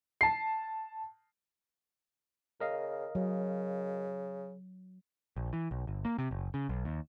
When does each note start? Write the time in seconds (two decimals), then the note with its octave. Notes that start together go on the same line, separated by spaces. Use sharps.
0.21 A5 C7
2.60 C#3 A#4 D#5 F5
3.15 C#3 F#3
5.37 A#1
5.53 E3
5.71 B1
5.87 G1
6.05 A#3
6.19 C3
6.31 F#1
6.54 C#3
6.69 B1
6.85 D#2